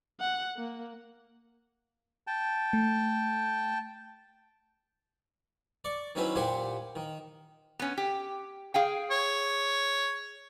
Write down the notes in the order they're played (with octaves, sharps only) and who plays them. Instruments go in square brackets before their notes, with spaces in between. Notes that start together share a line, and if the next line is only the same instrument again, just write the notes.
[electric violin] F#5
A#3
[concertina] G5 A5
[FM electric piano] A3
[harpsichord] D5 C#6
D#3 F#3 C#4 E4 B4 C5
A#2 G4 C5 F#5 G#5
D#3
[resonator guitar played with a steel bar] B3 C#4
G4
G#4 F5 G5
[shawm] C#5